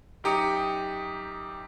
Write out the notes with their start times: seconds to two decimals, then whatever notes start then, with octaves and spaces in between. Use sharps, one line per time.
0.24 F#2 D#4 G4 A#5 D#6 C#7